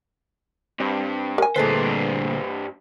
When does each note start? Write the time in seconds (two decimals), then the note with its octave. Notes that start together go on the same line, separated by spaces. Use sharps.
0.80 G2 C4
1.38 A#4 G#5
1.56 D2 G2 A#2 G#4 A4 B4 C5